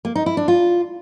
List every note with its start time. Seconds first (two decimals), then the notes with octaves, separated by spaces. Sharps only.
0.05 A#3
0.15 D#4
0.26 E4
0.37 D4
0.48 F4